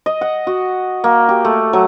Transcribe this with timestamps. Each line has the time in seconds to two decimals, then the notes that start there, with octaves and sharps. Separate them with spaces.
0.06 D#5
0.21 F#5
0.47 F#4
1.04 A#3
1.29 G4
1.45 A3
1.73 F#3